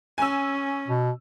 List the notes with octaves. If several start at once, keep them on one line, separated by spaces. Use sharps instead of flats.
C#4 G#5 E6
B2